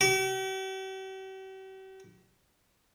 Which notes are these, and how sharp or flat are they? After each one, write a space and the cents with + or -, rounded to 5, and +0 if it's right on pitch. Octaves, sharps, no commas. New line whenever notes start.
G4 -45